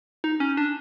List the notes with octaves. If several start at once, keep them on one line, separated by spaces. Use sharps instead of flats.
D#4
C#4
D4